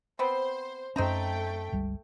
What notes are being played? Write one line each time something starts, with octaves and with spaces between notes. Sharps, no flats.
B3 C4 C5
F#2 A3 C4 C#4 D#4 G5 A#5
G1 C#2 G3